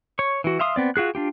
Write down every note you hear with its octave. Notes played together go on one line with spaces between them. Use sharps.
C#5 C#6
E3 F#4
E5 F5 C6 D#6
B3 C4 D5
F4 F#4 G#4 F#6
D4 F4 G4